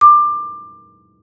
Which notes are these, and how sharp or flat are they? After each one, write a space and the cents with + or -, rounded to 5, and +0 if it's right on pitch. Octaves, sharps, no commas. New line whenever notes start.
D6 +20